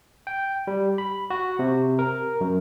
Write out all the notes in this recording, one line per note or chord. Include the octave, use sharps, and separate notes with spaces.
G5
G3
B5
F#4
C3
A#4
F#2